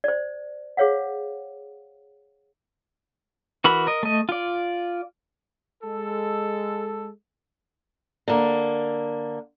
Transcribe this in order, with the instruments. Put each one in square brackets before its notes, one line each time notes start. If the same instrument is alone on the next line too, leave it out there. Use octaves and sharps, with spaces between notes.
[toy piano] C5 D5
G#4 C5 C#5 F5 F#5
[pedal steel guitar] E3 F#4 A#4 B5
A#4 D#5
A3 D#5
F4 D5
[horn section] G#3 A4
[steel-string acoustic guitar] D3 A#3